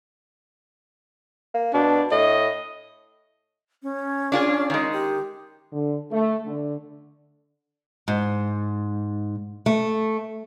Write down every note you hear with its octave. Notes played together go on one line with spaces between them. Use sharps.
A#3
B2 D4
A2 D#5
C#4
D4 F4 G#4
D#3 G#3
G4
D3
A3
D3
G#2
A3